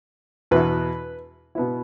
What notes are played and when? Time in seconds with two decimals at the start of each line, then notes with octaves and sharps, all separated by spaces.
0.51 E2 B2 B3 E4 B4
1.55 B2 B3 E4